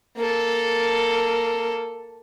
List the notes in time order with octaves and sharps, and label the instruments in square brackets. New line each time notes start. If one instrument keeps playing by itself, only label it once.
[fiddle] A#3 A4